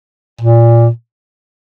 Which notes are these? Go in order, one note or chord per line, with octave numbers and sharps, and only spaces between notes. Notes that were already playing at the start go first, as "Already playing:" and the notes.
A#2